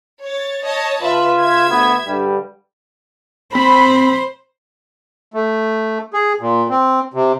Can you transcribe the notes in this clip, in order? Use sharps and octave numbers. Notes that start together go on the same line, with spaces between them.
C#5 A6
C#5 D#5 A5
C#2 F4 B4 E5
E5 G#6
D2 B3
G2 D3 G3
C4 C5 B5
A3
G#4
A#2
C4
C3